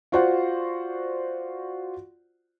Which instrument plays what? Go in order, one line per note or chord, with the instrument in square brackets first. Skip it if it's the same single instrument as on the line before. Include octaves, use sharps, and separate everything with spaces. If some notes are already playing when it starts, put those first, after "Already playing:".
[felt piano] F4 F#4 C5 D5 F#5